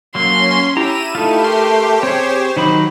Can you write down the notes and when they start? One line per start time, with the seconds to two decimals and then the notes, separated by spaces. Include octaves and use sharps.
0.15 F#3 A#3 C#4 C6
0.77 E4 G4 A#5 D#7 E7
1.15 A3 D#4 F4 G4
1.44 A#4 C6
2.03 C4 G#4 C5 C#5
2.56 D#3 F#3 D#4 B5